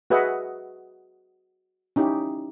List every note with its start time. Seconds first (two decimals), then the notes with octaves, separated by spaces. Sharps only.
0.10 F#4 G#4 B4 D#5 E5 F#5
1.96 C#4 D#4 E4 G4